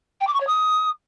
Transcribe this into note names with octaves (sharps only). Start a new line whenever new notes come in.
G5
D6
C#6
C#5
D#6